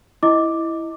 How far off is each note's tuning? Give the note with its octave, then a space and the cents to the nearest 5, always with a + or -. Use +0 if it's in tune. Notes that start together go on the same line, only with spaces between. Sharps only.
E4 +0 D#5 +10 D6 +0